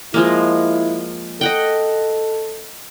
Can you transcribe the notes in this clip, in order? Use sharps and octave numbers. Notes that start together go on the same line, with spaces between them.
F3 G#3 A#3 E4
A4 D#5 F#5 G5